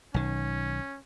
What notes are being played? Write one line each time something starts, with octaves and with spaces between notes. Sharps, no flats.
B1 D#3 C#4